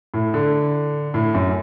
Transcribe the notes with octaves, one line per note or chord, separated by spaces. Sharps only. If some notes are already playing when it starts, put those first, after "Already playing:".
A2
D3
A2
F#2